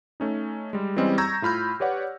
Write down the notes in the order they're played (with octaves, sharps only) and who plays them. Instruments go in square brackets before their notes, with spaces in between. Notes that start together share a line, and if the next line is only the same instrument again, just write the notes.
[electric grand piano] A3 C#4 D#4
G3 G#3
E3 G3 G#3 C4 C#4 D#5
A#5 C#6 E6 G6 G#6 A#6
A2 F4 B5 F6 G6
G4 B4 C#5 D5 F#5